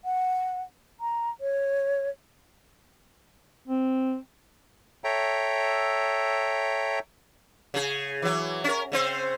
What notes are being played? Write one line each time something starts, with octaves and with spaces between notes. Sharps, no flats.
F#5
A#5
C#5
C4
A4 C#5 E5 G5 A#5
C#3 G#4
E3 F#3
C#4 A#4
C#3 C4 C5